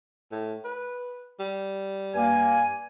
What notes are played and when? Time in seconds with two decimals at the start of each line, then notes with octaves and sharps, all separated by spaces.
0.32 A2
0.65 B4
1.40 G3
2.15 G2 A#3 G#5